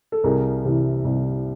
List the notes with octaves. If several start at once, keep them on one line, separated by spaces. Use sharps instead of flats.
A4
C2 G#4 A#4
C3 E3
C2